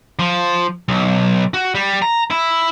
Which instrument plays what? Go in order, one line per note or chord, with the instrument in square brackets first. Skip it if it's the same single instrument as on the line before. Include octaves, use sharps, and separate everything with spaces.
[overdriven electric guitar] F3
B1
F#4
G3
A#5
E4